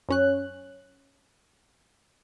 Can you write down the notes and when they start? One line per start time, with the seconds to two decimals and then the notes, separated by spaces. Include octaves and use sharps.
0.09 F#2 C#4 F#6